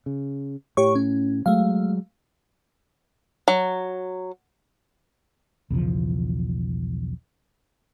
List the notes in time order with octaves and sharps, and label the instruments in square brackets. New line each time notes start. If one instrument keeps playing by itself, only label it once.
[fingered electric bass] C#3
[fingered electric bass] A2 [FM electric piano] G4 C#5 C#6
[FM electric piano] C#4
[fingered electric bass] F#3 G#3 [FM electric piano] A3 F5
[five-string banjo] F#3
[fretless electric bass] B1 E2 C#3 F3